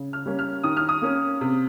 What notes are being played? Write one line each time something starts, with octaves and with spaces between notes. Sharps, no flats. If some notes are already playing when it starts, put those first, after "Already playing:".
Already playing: C#3
F6
G3 A#3 C#4
F6
D#3 D#6
F6
D#6
A#3 C#4
C3